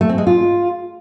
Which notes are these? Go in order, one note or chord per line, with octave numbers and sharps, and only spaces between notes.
A3
C4
G#3
F4